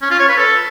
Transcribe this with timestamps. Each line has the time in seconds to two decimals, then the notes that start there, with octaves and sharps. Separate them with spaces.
0.02 C#4
0.11 F4
0.20 C#5
0.28 B4
0.37 A4